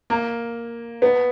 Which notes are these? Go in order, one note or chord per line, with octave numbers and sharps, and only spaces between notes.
A#3
B3